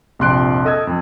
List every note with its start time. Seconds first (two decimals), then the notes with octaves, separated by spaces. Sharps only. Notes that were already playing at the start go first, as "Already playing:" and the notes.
0.19 A#1 F2 C3 C6 F#6 D7
0.65 A4 D#5 D#6 E6 G#6
0.87 F2